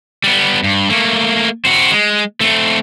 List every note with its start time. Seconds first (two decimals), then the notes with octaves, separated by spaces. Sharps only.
0.24 G3 B3
0.64 G2
0.90 A3 A#3
1.65 C4 F#4
1.91 G#3
2.41 A3 C4